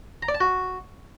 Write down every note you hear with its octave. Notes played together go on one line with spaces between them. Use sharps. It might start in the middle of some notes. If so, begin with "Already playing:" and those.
A#5
D5
A5
F#4